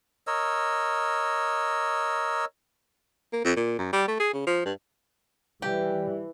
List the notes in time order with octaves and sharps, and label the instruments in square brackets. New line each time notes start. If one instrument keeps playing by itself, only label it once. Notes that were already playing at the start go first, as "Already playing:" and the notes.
[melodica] A#4 C#5 D#5 E6
[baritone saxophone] A#3
F2
A#2
F#2
G3
A3
G#4
C#3
F3
G2
[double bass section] E3 [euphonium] G3 [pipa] G4